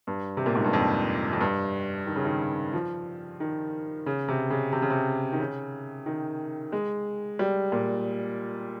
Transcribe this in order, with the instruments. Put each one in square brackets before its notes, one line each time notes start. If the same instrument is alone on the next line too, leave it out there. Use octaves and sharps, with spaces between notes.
[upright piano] G2
C3
A#2
G#2
G2
F2
F2
G2
D#3
C#3
D#3
F3
D#3
C#3
C3
C#3
C3
C#3
C3
D#3
C#3
D#3
G#3
G3
A#2